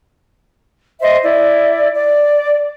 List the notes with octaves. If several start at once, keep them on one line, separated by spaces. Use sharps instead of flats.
C5 D#5 E5
E4 D5
D5